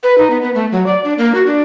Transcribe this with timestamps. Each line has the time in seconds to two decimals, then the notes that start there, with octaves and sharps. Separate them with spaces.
0.03 B4
0.18 D#4
0.30 B3
0.42 B3
0.55 A3
0.72 F#3
0.86 D5
1.04 D4
1.18 A#3
1.35 F#4
1.46 D4